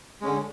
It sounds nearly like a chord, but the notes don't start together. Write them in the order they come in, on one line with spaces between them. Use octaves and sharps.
G#3 C#4 D3